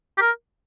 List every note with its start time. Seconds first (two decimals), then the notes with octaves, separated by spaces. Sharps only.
0.18 G4
0.21 A#4